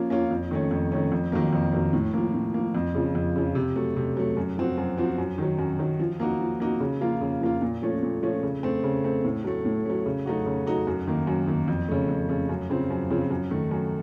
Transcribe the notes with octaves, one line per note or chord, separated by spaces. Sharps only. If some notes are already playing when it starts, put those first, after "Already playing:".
Already playing: F3 A#3 C#4 F4
A#3 C#4 F4
F2
D#3 A3 C#4
F2
D#3 A3 C#4
F2
D#3 F#3 A#3
F2
D#3 F#3 A#3
A2
F3 A#3
A2
F3 A#3
F2
C#3 F3
F2
C#3 F3
C3
F#3 A3
C3
F#3 A3
F#2
F3 C4 F#4
F#2
F3 C4 F#4
F#2
D#3 F#3
F#2
D#3 F#3
F3
A#3 D#4 F#4
F3
A#3 D#4 F#4
C#3
F3 A#3 F4
C#3
F3 A#3 F4
A#2
F3 A3 C#4
A#2
F3 A3 C#4
C#3
A3 C4
C#3
A3 C4
A2
F#3 A3
A2
F#3 A3
C#3
F#3 A3 D#4 F#4
C#3
F#3 A3 D#4 F#4
F#2
D#3 A#3
F#2
D#3 A#3
F2
C#3 A3
F2
C#3 A3
F#2
C#3 F3 C4
F#2
C#3 F3 C4
F#2
D#3 A3
F#2